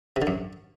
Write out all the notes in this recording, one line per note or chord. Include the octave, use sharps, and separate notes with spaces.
C3
D3
F#2